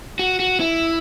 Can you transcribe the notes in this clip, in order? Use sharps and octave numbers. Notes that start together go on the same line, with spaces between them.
F#4
F#4
E4